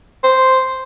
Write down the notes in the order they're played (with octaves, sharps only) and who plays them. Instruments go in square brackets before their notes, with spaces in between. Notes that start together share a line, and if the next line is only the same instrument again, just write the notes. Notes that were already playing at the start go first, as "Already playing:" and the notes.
[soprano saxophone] C5